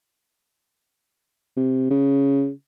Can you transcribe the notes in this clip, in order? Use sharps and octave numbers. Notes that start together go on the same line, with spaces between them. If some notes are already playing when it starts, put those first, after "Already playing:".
C3
C#3